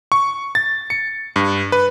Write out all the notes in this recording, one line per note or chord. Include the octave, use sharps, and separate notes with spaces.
C#6
A6
C#7
G2
B4